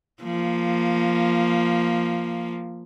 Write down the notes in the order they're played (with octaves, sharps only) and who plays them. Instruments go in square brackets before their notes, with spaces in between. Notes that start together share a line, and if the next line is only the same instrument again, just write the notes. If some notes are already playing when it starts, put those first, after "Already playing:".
[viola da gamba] F3 A#3